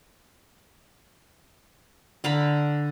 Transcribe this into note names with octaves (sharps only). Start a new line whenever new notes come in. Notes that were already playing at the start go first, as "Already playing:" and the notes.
D3 F5 A#5 B5